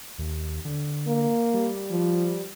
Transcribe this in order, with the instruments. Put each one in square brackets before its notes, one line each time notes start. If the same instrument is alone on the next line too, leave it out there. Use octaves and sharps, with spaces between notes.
[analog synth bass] D#2
D3
[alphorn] A#3
[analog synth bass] G3
[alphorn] F3